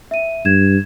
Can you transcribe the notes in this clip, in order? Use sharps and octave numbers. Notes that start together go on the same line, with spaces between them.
E5 D#7
G2 G#6 E7